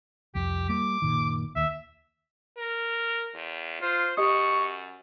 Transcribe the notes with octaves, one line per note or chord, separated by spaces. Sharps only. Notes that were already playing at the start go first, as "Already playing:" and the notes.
C2 F2 G4
G3 A#3 D6
F#1 A#2 D#3
D#2 E5
A#4
E2
F4 C5
F#2 G4 D#5 C#6 D#6